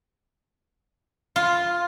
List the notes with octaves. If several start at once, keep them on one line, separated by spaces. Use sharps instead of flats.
F4